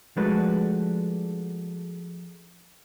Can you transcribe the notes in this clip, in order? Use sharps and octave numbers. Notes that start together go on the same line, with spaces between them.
F3 G#3 A3 D4 F#4 B4